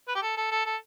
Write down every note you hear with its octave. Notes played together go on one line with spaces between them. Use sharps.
B4
G4
A4
A4
A4
A4